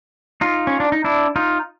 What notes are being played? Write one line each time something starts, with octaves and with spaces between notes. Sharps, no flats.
D#4 F4
C#4
D4
D#4
D4 E4
D#4 F4